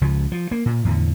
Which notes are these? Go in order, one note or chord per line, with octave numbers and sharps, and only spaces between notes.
C#2 C#3 F3
F3
A#3
A#2
E2 A2 D3